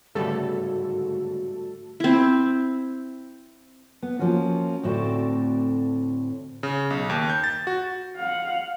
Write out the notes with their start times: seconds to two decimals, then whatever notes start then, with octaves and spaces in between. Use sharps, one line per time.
0.15 G1 G#2 C#3 G3 A3 B3 F#4 A4
2.00 C4 E4
4.02 B3
4.19 F3 A#3 C#4 F4 F#4
4.83 D2 A2 C4 F#4 A4 D5
6.63 C#3
6.90 B1
7.10 D#2
7.30 G6
7.44 A6
7.67 F#4
8.16 F5 F#5